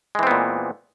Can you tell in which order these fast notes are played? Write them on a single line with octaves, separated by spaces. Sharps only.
G#3 E3 C4 B3 A#2